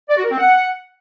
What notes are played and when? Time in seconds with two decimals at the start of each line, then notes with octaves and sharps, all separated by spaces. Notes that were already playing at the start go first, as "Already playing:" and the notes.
0.09 D5
0.17 F#4
0.24 A#4
0.31 C4
0.38 F#5